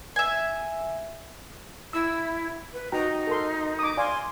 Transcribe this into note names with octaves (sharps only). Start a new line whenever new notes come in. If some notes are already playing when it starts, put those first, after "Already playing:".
E5 G#5
E4 E6
B4
D#4 F#4 G5 A#5
A4 A#4 C6
D6 D#6
D5 F5 G#5 C6